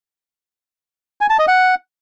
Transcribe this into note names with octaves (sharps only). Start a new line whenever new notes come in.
G#5
A5
D#5
F#5